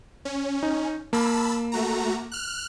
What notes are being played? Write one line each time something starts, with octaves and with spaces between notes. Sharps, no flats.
C#4
D#4
A#3 A5 B5 E6
A3 F#4 A#5
F6 F#6